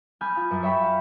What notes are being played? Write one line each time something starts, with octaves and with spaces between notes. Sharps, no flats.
G#5 B5 D#6 F6 G6
F4
F#2
C#5 E5 G5 B5
F5